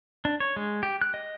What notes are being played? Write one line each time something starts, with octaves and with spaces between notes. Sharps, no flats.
D4
C#5
G#3
G4
F#6
D#5